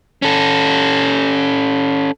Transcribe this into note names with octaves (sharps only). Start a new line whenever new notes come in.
C#4 A4